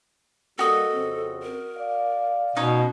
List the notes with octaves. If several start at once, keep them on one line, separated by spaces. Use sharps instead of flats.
G3 A#3 F#4 A4 D#5
F2 C#3 C4
A#4
D5 F5
B2 C#4 D#4 C#5